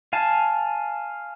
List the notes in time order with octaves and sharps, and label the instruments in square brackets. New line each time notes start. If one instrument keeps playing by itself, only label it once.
[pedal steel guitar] F5 G#5 A5